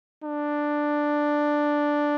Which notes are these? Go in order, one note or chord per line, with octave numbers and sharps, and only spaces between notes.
D4